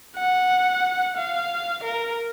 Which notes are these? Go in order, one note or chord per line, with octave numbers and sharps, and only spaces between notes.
F#5
F5
A#4